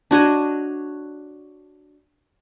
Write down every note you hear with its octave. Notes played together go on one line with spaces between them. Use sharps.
D4 F#4 C#5 D#5